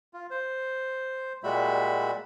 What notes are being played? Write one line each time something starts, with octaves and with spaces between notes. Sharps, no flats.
F4
C5
A#2 G3 G#3 F#4 E5 B5